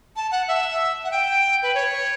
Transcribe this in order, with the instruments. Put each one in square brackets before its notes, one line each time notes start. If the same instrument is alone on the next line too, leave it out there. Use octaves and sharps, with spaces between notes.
[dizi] A5
F#5
E5
F#5
G5
B4
C#5